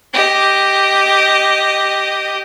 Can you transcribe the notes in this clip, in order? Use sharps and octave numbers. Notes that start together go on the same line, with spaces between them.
G4 D#5